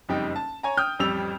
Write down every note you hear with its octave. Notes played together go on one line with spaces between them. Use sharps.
F#1 F2 G3 D#4 G5
A5
C#5 G#5 A#5
G5 D#6 F6 G6
A1 F2 G3 E6 F7